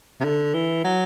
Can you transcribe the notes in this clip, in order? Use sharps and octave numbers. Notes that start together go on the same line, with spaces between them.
C3
D3
E3
F#3